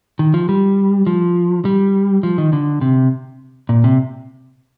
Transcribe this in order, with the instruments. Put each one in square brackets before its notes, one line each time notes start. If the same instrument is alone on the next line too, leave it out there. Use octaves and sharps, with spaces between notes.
[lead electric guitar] D#3
F3
G3
F3
G3
F3
D#3
D3
C3
A#2
C3